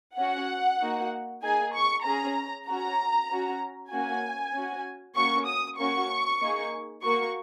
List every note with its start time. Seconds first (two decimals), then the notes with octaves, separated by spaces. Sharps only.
0.18 C#4 F#4 F#5
0.81 A#3 D#4 F#4
1.43 A#3 D#4 G#4 G#5
1.75 C#6
2.05 C#4 G#4 A#5
2.67 C#4 F#4 A#5
3.30 C#4 F#4
3.92 A#3 C#4 F#4 G#5
4.54 C#4 F#4
5.16 A#3 C#4 F#4 C#6
5.47 D#6
5.78 A#3 C#4 F#4 C#6
6.41 A#3 D#4 G#4
7.03 A#3 F#4 C#6